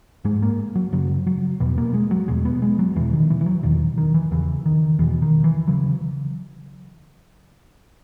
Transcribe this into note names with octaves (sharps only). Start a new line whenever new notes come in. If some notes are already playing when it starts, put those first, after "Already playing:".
G#2 G#3
A#3
F#3
F#2 C#3 F#3
F#3
E2 B2 B3
A#3
G#3
F#3
E2 B2 G#3
B3
G#3
F#3
E2 B2 E3
D#3
E3
E3
F#3
E2 B2 D#3
D#3
E3
E2 C#3 E3
D#3
E2 B2 E3
D#3
E3
C#3 F#3